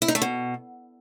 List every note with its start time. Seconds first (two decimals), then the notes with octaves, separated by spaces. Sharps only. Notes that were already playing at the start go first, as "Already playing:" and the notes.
0.02 E4
0.08 D#4
0.15 A3
0.22 B2